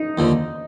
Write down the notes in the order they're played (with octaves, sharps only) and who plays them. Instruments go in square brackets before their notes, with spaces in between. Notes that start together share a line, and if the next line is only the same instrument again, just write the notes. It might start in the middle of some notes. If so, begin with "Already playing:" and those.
Already playing: [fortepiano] D#4
[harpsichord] D#2 D3 F3